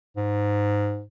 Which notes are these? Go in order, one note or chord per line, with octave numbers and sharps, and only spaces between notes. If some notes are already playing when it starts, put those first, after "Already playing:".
G#2